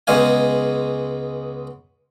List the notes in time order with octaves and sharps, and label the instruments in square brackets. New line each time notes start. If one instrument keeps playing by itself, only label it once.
[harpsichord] C#2 G#3 B3 F5 G#5